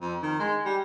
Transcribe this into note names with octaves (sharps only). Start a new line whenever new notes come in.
F2
D#3
G#3
G3